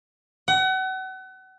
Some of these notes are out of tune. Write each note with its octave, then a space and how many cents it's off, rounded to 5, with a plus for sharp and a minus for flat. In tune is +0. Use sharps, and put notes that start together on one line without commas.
F#5 +35